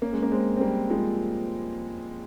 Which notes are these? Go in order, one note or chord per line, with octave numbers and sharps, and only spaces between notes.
A#3 C#4
G#3
A#3
G#3 C4
C4
G3 A#3
F3 G#3